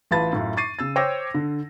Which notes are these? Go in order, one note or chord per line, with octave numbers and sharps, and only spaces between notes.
A1 F4 B4 A5 B5 A6
F#2 A2 F4
C#6 D6 A6 C7 D#7
C#3 E6 A6
C5 C#5 G5 D6 E6 A#6
D3